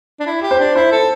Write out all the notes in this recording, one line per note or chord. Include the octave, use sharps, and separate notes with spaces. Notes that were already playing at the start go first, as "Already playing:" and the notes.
D4
E4
G4
C5
D4
E4 C5
A4